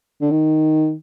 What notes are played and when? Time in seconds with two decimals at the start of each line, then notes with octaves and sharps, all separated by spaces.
0.21 D3
0.31 D#3